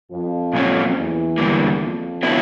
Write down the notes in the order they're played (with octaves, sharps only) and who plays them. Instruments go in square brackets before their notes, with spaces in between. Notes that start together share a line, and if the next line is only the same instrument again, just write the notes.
[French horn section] F2 F3
[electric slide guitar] A#2 F#3 A#3 C#4
[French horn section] E2 E3
[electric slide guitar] D3 G3 A#3
[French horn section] F2 F3
[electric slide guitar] D3 F#3 B3 E4